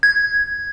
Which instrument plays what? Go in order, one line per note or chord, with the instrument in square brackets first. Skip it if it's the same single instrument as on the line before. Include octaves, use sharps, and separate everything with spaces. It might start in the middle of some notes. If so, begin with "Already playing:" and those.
[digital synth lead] G#6